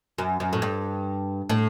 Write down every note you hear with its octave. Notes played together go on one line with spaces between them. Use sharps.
F#2
F#2
A2
G2
A2